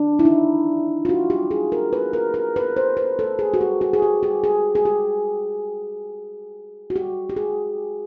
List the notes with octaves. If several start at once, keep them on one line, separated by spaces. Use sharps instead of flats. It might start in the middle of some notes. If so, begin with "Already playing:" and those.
Already playing: D4
E4
D#4
F4
F#4
G4
G#4
A#4
B4
A#4
A#4
B4
C5
B4
A4
G#4
F#4
G4
F#4
G#4
G4
G4
G#4
G#4
G4
F#4
G4
G4
G#4